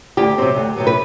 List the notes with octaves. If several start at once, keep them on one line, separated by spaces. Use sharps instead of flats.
D2 G4
C3 F#3 C4
D2
C3 F#3 B3
B4